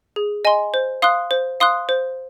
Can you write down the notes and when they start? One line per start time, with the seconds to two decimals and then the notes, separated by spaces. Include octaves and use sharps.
0.16 G#4
0.45 D#5 G#5 C6
0.74 C5
1.02 F5 C6 D#6 F#6
1.31 C5
1.60 F5 C6 D#6 F#6
1.89 C5